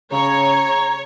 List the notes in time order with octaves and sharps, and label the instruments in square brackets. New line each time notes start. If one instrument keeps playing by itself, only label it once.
[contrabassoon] C#3 [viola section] C#5 [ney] A#5